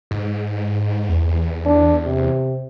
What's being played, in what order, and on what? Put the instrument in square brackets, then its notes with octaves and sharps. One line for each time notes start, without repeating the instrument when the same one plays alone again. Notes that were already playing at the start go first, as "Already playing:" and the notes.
[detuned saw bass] G#2
E2
[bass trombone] D4
C3